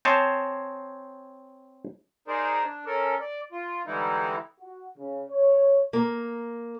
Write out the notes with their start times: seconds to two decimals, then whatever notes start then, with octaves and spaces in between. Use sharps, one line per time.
0.05 C4 C5 C#5 D#5 G#5 A5
2.28 D#4 G#4 A#4 C5 D5
2.64 D4
2.86 C#4 A4 A#4
3.20 D5
3.52 F4
3.86 D3 E3 G3 G#3 D#4 E4
4.60 F#4
4.98 C#3
5.30 C#5
5.93 A#3